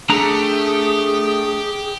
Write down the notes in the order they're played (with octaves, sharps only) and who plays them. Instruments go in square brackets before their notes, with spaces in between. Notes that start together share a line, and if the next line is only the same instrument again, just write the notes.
[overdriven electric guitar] A3 [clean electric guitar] D4 A#5 [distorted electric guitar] G4 [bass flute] G#4